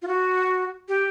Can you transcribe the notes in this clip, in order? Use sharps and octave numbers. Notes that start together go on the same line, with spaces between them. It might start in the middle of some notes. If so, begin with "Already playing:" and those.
F4
F#4
G4